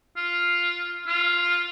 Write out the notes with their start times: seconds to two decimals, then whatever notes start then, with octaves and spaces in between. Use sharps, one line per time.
0.17 F4
1.07 F4